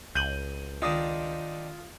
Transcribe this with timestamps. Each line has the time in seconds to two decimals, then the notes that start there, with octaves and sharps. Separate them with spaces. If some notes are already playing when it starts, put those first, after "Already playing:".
0.15 C#2 G6 D#7 F#7
0.82 D#3 D4 D#4 F4 D#6